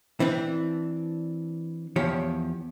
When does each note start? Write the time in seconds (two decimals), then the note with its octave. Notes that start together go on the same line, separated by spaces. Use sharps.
0.20 E3 C4 D4
1.96 E2 F3 G4 C#5